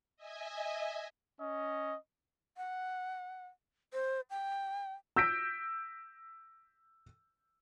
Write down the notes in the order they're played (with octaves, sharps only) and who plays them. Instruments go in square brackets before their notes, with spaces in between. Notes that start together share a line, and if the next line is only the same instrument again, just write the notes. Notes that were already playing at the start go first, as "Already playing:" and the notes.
[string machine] D#5 E5 G#5
[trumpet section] C#4 D#5
[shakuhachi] F#5
C5
G5
[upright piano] E6 G6 A#6 B6 D7